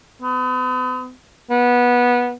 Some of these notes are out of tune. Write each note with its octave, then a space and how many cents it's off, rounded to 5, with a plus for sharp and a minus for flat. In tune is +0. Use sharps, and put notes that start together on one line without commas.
B3 +40
B3 -15